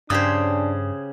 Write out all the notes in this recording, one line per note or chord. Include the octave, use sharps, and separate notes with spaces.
G2 C#3 D4 G4 C5 G#5 D#6